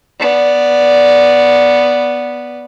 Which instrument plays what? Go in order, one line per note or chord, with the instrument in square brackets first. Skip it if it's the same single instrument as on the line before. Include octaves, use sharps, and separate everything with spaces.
[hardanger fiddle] B3 D5